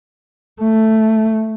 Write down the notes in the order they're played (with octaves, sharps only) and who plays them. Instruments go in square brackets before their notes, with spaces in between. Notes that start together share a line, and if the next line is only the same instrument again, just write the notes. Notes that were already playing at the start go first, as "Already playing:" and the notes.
[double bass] A3